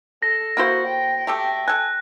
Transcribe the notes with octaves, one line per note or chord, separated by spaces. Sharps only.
A4 A#6
A#3 E4 F#4 C5
G5
A3 G4 A4
A4 G#5 F#6